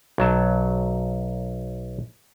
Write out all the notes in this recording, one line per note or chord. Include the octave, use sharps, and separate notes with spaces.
B1 F#3 A5